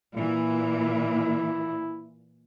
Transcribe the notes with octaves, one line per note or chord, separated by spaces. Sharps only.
A#2 E3 E4